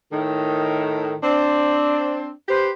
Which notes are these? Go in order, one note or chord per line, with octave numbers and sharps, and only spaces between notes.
A2 D#3
C4 D4
G4 B4 C5